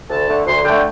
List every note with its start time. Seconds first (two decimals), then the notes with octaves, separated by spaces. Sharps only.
0.10 D2 A5
0.28 D3 A3
0.46 D2 C6
0.65 D3 A3 G5